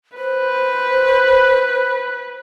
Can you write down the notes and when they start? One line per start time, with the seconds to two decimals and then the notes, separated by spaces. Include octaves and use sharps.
0.17 B4 C5